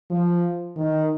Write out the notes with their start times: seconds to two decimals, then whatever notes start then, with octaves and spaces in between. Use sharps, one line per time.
0.11 F3
0.76 D#3